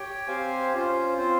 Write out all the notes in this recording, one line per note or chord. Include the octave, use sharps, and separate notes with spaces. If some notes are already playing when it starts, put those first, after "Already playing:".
Already playing: G4 C#5 G5
C4 G4 C5 F5 G#5
C#4 F4 C5
C4 F4 C5